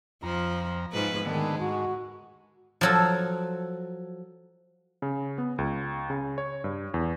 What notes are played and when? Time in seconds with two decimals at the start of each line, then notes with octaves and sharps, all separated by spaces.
0.23 F2 F3 A#5
0.93 G#2 F3 B4
1.26 D3 D#3 G#3 A3 B3
1.60 G#2 F#4
2.81 F3 F#3 A4
5.02 C#3
5.38 B3
5.58 C#2
6.10 C#3
6.38 C#5
6.64 G2
6.94 E2